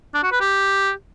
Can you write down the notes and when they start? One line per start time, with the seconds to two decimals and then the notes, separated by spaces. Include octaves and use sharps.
0.14 D4
0.23 F#4
0.32 B4
0.41 G4